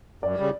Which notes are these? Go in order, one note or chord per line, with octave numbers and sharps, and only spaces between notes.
F#2 D5
C#3 G3